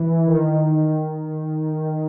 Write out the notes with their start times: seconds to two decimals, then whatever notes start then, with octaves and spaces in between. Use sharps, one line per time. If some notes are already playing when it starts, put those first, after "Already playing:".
Already playing: E3
0.26 D#3